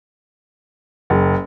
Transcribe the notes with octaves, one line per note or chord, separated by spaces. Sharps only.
F#1